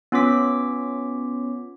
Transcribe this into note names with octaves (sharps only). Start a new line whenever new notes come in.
B3 C#4 F4 C#5 D6 B6